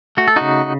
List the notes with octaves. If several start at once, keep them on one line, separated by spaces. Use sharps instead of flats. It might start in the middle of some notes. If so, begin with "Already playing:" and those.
A3 F#4
A4
C#3 D#4 F#4